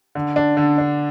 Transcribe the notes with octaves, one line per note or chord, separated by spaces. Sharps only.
D3
D4
D3
D4